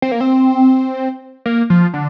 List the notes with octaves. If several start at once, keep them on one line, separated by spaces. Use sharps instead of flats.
C4
A#3
C4
A#3
F3
D3